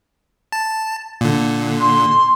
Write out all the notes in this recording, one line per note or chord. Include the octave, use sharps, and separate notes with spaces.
A5
A#2 D3
C6